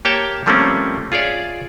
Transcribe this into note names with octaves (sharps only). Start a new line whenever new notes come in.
A#3 G4 C#5 G5 A5
F3 G3 A3 A#3 C4 C#4
F4 G#4 C#5 D5 E5